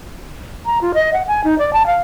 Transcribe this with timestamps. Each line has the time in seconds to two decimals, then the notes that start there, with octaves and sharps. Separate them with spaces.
0.66 A#5
0.81 F4
0.94 D#5
1.13 F#5
1.27 G#5
1.44 D#4
1.58 D5
1.73 A5
1.87 F5